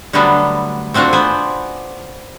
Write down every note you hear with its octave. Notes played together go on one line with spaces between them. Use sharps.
D3 F#3 G3 A3 B3 D4
A3 C4 D4 F4 F#4
B3 C5 D5 G#5